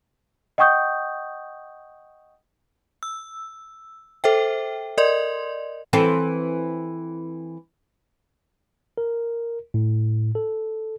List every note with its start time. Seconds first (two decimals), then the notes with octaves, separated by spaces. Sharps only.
0.58 D#5 F#5 G5 C#6 D#6 G6
3.03 E6
4.24 A4 C5 E5 G5
4.98 A#4 D5 D#5 C6
5.93 E3 C4 A4
8.98 A#4
9.74 A2
10.35 A4